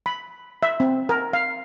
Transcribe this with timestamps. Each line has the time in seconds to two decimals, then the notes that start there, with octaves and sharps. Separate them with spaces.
0.06 B5
0.63 E5
0.80 C4
1.09 A#4
1.33 F5